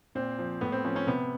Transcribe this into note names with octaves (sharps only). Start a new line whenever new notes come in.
A#2 C4
F3
A2 B3
C4
F3 C#4
C#4
C3 B3